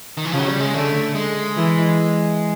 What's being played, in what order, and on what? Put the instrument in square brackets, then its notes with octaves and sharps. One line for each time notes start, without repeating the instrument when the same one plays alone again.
[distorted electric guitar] D#3
E3
[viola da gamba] C#3 [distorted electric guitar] F3
[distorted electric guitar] F#3
G3
G#3
[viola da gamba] D3 [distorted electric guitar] A3
[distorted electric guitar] G#3
[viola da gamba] E3